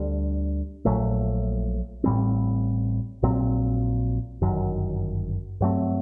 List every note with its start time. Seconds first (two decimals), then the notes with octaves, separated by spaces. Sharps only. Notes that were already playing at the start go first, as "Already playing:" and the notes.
Already playing: D2 D3 G3
0.85 A#1 A#2 F#3 A3
2.04 A1 A2 G3 C4
3.23 A#1 A#2 F#3 C4
4.42 G1 F#2 D#3 F#3
5.61 G2 F#3 A3 C4